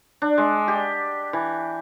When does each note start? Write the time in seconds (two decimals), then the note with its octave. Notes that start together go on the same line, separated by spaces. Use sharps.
0.22 D4
0.38 G#3
0.68 G4
1.33 E3